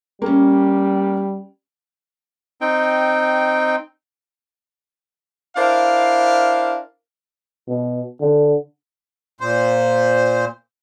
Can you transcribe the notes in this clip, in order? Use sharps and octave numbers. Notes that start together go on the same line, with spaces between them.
G3 A#3 C#4
C4 D#4 G5
D4 E4 A#4 C5 F5
B2
D3
A#2 C5